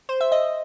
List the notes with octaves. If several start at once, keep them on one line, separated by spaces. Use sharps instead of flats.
C5
E5
D#5